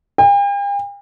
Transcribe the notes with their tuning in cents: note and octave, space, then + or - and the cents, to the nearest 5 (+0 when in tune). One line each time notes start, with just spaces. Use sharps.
G5 +45